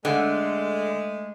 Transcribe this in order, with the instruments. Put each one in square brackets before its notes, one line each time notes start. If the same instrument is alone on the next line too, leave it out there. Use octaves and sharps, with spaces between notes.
[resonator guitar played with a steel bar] D3 [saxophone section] G#3 A3